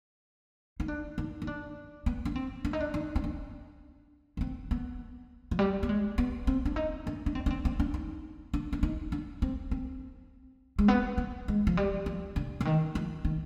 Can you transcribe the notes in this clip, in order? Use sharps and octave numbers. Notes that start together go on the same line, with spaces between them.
D#4
D4
D#4
D#4
D4
B3
D4
C4
D4
D#4
D4
D#4
C4
D4
B3
C4
B3
F3
G3
B3
G#3
B3
C4
D4
D#4
D4
D4
C4
D4
C4
C4
D4
D#4
D4
D4
D#4
D4
C4
C4
G#3
B3
B3
G#3
F3
G3
F3
D3
D3
D#3
F3
D#3